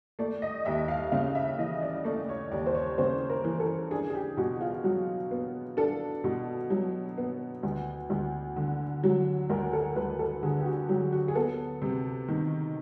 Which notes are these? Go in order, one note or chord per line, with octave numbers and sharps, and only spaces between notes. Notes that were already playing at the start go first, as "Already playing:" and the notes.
A3 D5
D#5
D#2 E5
F5
C#3 F5
E5
E3 D#5
D5
A3 D5
C#5
D#2 D5
C5
C#5
C#3 C5
A#4
E3
A4
D4 G#4
G#4
G4
B2 F#4
F4
F#3 F#4
B3
D4 A4
B2
F#3
B3
D2
D2
D3
F#3
D2 A#4
A4
D2 B4
A4
D3 G#4
G4
F#4
F#3 G4
F#4
G#4
B3 A4
C3
D#3